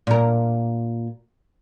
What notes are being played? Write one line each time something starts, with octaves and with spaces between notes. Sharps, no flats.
A#2 A#4